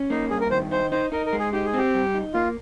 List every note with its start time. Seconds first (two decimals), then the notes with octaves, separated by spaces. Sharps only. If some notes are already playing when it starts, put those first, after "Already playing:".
Already playing: C#4
0.10 A#3 D#4
0.31 G2 G#4
0.41 A#4
0.51 D#3 C5
0.71 D#4 C5
0.92 D#4 C5
1.12 D#4 A#4
1.26 A#4
1.33 G#3
1.39 G#4
1.53 D#4 G4
1.66 G#4
1.74 C4 G4
1.94 G3
2.14 D#4
2.34 A#3 F4